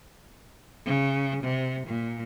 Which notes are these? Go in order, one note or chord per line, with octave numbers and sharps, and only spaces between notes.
C#3
C3
A#2